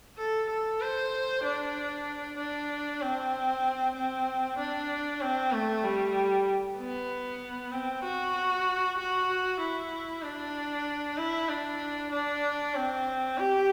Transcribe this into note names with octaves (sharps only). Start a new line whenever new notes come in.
A4
A4
C5
D4
D4
C4
C4
D4
C4
A3
G3
B3
C4
F#4
F#4
E4
D4
E4
D4
D4
C4
G4